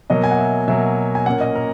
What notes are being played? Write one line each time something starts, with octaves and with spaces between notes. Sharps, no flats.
B2 F#3 A#3 D#5
G#5
F#5
E5
B2 F#3 A#3 E5
G#5
A#2 A#3 C#4 F#5
D#5
A#4